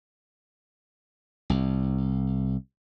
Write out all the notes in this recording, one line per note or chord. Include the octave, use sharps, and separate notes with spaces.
C2